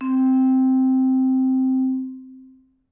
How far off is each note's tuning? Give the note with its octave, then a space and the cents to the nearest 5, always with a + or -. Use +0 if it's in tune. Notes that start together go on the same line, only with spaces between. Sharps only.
C4 -5